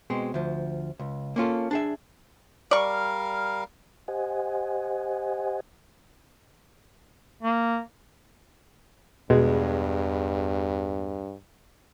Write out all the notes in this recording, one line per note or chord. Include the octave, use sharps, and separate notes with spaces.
B2 G#3 C4
D2 F3
C#2
A#3 C#4 F4 A4
D4 G#4 E5
G3 A#4 D5 F5 C#6
G4 C5 D#5 F#5 G#5
A#3
E2 G2 B2 G#3